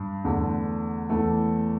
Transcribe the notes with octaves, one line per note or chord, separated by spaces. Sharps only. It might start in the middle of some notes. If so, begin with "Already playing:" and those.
Already playing: G2
E2 D3 A3
E2 E3 A3